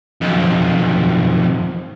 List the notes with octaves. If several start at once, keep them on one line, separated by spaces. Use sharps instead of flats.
B1 F2